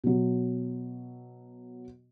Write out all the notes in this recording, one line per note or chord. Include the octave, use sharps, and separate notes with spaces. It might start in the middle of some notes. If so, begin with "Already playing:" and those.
B2 F#3